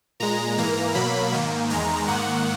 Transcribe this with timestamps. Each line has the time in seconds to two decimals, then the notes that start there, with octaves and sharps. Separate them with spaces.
0.20 A#2 G#3 A#5
0.58 G#2 E3 A#3 A#5
0.94 B2 F#3 A#3 B5
1.32 G#2 D#3 A#3
1.70 E2 D#3 G#3 A#5
2.08 G#2 D#3 A#3 F#5